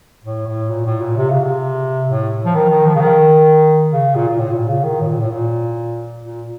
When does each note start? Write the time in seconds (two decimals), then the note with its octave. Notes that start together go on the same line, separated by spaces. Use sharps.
0.24 A2
0.47 A2
0.70 A#2
0.86 A2
1.01 A#2
1.16 C3
1.30 C#3
1.43 C3
2.08 A2
2.45 F3
2.54 D#3
2.69 D#3
2.85 F3
2.95 C#3
3.00 D#3
3.92 C#3
4.15 A#2
4.28 A#2
4.38 A2
4.52 A#2
4.68 C#3
4.83 D#3
5.01 A2
5.07 A#2
5.20 A2
5.30 A#2
6.22 A#2